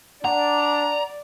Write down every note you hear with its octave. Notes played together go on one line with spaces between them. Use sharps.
D4 D5 F#5 A#5